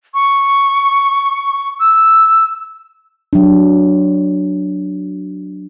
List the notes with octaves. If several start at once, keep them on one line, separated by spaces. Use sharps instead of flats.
C#6
E6
F#3 D4